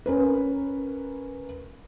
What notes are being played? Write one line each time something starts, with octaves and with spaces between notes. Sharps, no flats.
C#4 A#4 B4